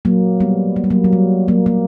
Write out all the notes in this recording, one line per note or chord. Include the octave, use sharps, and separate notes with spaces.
F#3 A#3
G3 B3
A#3
G3
F#3 A#3
F#3
G3
F#3 A#3
F#3 A#3